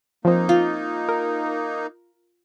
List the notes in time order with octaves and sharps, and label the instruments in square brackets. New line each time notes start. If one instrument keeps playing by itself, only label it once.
[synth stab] F3 C4 [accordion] A#3 D#4
[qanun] F4
[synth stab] A#4